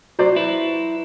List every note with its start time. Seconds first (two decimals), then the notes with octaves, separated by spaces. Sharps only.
0.19 F#3 C5 D5
0.36 E4 B4